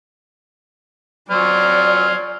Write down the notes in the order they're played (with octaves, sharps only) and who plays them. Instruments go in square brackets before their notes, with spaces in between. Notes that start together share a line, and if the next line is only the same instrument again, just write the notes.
[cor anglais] F#3 [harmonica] C5 G#5 F6 [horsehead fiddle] D5